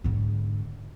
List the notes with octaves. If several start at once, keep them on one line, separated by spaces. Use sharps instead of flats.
G#2 D3